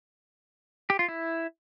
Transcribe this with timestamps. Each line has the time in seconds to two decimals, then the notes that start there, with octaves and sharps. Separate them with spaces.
0.90 G4
0.99 F4
1.08 E4